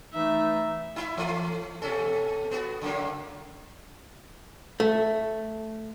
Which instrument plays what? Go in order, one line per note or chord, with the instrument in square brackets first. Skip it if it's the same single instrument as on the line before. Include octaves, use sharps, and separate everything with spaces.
[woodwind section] E3 A3 D#4 [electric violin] E5
[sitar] D#4 E4 E5
E3 A3
B2 C#4 A4
B3 F#4
C#3 F#3 A#3
[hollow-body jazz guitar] A3